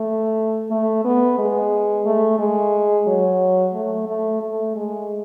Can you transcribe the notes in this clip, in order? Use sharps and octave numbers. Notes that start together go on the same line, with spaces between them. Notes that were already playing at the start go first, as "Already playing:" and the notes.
Already playing: A3
A3
B3
G#3
A3
G#3
F#3
A3
A3
A3
G#3